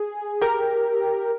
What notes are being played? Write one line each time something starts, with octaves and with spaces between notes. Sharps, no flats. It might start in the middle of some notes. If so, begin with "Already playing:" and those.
Already playing: G#4
G4 A#4